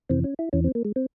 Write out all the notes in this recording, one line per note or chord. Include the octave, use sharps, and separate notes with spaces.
F2 C3 E3 C4
C#4
E4
E2 E3 C#4
C4
A#3
G#3
C4